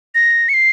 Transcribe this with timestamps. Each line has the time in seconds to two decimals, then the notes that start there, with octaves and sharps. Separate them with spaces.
0.15 A#6
0.49 C#7
0.54 C7